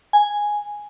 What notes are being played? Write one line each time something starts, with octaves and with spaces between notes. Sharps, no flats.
G#5